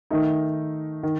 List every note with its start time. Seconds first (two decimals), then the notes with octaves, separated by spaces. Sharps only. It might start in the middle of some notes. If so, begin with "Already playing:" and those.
0.10 D#3 A3 D#4
1.03 D#3